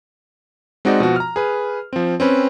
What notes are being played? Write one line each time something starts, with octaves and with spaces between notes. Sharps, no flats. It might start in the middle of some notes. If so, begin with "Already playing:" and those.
G#3 C4 D#4 F#4 D5 D#5
B2 F3 F#4
A#5 F6
G#4 B4
F3 C4
C4 C#4 B4